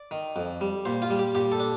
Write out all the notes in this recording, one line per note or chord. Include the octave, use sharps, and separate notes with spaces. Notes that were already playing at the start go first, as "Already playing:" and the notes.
Already playing: D5
D#3
F2
G3
A#2 C5
F4
G3
G4
A#2 G4
A4
D4